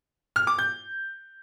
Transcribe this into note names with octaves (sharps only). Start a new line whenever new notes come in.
F6
D6
G6